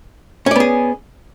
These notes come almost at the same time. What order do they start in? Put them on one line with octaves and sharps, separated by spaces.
C#4 D5 B3 G#4